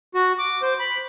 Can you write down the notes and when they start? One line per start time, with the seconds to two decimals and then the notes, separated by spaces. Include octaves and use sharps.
0.15 F#4
0.39 D6
0.63 C5
0.79 B5